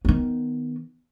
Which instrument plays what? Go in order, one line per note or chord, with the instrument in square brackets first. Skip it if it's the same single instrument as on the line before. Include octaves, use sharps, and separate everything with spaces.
[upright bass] D#3 B3